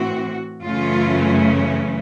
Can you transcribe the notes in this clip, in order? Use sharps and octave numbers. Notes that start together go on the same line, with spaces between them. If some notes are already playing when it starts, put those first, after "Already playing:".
Already playing: A2 E3 C4 F#4
F#2 C#3 E3 A3 C#4 F4